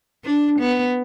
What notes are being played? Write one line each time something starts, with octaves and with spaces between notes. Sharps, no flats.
D4
B3